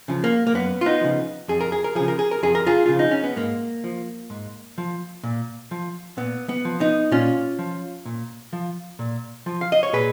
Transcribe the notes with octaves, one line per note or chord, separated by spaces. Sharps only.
C#3 F3
A#3
A#3
F#2 B3
F4
B3 D#4
C#3 F3
F2 G#4
A#4
G#4
A#4
C#3 F3 G#4
A#4
G#4
A#4
F2 G#4
A#4
F4 G#4
C#3 F4
F3 D#4
C#4
B3
G#2 A#3
F3
G#2
F3
A#2
F3
A#2 B3
B3
F3
B3 D#4
A#2 C#4 F4
F3
A#2
F3
A#2
F3
F5
D#5
C#5
A#2 G#4 B4